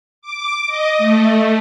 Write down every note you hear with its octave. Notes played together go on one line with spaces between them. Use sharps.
D6
D#5
A3